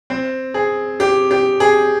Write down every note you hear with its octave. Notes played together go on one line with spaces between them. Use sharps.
C4
G#4
G4
G4
G#4